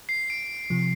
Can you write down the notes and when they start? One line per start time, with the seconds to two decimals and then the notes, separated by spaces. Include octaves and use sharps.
0.09 C7
0.30 D7
0.70 C3 F3